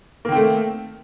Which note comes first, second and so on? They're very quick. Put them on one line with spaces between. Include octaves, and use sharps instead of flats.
A#3 D#3 C4 A3